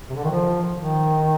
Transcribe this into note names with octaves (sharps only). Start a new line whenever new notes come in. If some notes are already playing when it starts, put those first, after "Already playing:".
C3
D3
D#3
F3
D#3